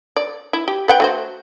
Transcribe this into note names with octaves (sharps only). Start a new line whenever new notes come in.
D5
E4
G4
B4 F#5 G5
A3 F#4 C5